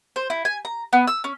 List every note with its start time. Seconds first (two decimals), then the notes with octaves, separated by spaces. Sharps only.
0.16 C5
0.30 E4
0.45 G#5
0.65 A#5
0.93 B3
1.07 E6
1.24 C#4